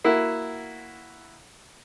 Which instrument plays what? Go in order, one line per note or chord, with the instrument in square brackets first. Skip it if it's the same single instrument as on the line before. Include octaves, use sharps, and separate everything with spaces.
[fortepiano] A#3 E4 F#4